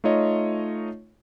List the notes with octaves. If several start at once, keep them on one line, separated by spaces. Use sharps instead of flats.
A3 D#4 F4 C#5 D#5